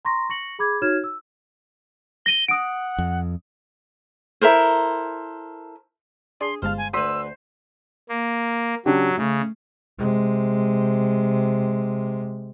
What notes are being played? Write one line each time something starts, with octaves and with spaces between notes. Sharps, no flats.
A#5 C6 C#6 A#6
C#6 A#6 C#7 F#7
G#4 B5 D6 G#6
D#4 F#4 C#5 F6 G#6 E7
E6
A#6 D#7 G7
F#5 D#6 D7
F2
E4 A4 A#4 C5
D4 G#4 C6
G1 G#3 C5 F5 A5 F6
G#5
D2 B4 C5 D#6 E6 B6 D#7
A#3
C#3 F#3 D4 G4
C#3 A3
C3 G#3